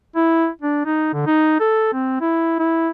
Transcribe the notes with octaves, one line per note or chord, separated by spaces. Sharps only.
E4
D4
D#4
D3
D#4
A4
C4
E4
E4